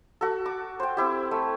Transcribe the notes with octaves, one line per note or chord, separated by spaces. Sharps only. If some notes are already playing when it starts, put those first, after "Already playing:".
F#4 A4
D6
C5 G5
C4 E4 G4
A3